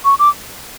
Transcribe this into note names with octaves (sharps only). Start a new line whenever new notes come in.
C#6
D6